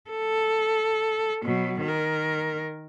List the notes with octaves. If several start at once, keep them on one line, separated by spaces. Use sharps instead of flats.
A4
B2 F#3
D#3 A#4